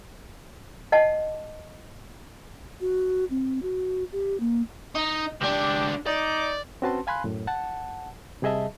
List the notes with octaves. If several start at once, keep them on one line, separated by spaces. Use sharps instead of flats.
D#5 F#5 A5
F#4
C4
F#4
G4
A#3
D#4
C#2 D4 G4
D#4 D5
C4 C#4 F#4 B4 A5 C6
F5 G#5 B5 C6 F#6
F#2 A2
F#5 A5
C3 G3 G#4 D#5 E5 A5